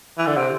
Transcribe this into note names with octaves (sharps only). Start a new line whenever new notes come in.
E3
D3
C3